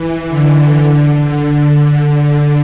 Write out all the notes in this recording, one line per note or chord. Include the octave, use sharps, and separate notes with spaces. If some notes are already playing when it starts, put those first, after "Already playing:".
Already playing: E3
D3
D3